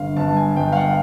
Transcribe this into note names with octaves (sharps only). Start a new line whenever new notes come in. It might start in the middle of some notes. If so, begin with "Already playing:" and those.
Already playing: G1 D3 F5
G1 A5
G#5
G1 G5
F5
F#5